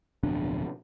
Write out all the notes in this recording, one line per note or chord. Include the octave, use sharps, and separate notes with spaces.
D1 F2 B2 D4